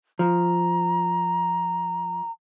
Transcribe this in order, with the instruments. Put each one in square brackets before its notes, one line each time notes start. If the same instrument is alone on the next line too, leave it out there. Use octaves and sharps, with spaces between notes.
[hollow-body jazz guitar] F3 [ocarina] A#5